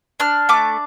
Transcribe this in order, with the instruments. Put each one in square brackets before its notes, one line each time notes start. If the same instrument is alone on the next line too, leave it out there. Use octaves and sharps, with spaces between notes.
[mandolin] D4 F6
A3 D6